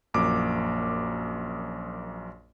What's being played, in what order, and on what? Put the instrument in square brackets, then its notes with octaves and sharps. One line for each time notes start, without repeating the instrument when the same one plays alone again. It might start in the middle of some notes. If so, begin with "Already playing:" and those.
[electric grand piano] A#1 F#2 A#3 D6